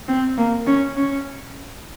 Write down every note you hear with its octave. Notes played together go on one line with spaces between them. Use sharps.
C4
A#3
C#4
C#4